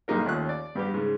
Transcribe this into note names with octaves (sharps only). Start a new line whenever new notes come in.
B1 G2 A#3 D#4 A#4
D#2 A3 C#4 F4 F#6
D5
G2 G3 B3 G4
G#2 C#3